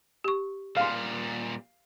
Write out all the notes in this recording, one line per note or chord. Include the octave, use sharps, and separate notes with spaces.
G4 C#6
A#2 G3 F5 C6